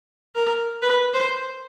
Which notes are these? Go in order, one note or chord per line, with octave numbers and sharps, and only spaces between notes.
A#4
B4
C5